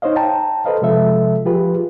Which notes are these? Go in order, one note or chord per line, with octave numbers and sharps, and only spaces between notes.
D#4 C5 C#5 D#5 F5
G5 A5 A#5
A4 B4 C5 D#5 F5
C3 F3 G#3 A4 E5
F3 F4 G4 G#4 B4